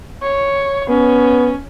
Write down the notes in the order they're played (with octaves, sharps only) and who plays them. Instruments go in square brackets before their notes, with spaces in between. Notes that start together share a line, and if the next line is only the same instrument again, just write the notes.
[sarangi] C#5
[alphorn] B3 [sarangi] C#4